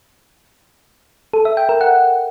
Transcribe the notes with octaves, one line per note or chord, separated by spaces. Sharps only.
A4
E5
G5
A#4
F#5